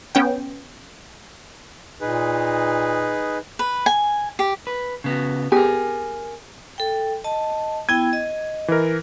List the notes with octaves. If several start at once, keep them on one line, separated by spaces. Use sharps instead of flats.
B3 C#4 G5
A#2 D#4 G#4 B4
B4
G#5
G4
B4
C#3 B3 F#4
B3 G4 G#4 A#4 G#5
A4 G5
D#5 A5
B3 E4 G5 G#6
D#5
E3 A#4